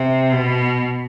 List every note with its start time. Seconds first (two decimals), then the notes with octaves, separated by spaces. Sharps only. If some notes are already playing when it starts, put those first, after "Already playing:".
Already playing: C3
0.33 B2